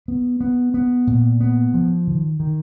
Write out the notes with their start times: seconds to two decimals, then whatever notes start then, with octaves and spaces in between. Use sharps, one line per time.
0.08 B3
0.41 B3
0.74 B3
1.07 A#2
1.41 B3
1.74 F3
2.07 D#3
2.40 D#3